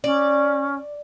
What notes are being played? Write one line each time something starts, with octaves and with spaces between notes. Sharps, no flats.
C#4 D5